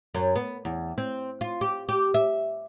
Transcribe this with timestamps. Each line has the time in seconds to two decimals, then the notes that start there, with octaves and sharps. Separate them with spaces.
0.15 F#2
0.36 B3
0.65 E2
0.98 C4
1.41 F4
1.61 G4
1.89 G4
2.14 E5